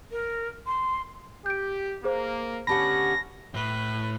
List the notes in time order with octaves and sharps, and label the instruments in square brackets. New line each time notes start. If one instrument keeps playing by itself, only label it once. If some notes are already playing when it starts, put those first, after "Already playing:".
[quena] A#4
C6
[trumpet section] G4 [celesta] G6 D7
[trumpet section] A#3 [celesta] G#4 C5
[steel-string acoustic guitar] D2 G4 F#5 [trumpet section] B3 C#4 [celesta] A5 B5 [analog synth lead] A#6
[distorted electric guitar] A2 [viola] B4